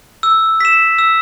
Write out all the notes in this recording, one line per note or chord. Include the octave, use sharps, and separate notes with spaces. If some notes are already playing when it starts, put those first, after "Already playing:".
E6
B6 E7
E6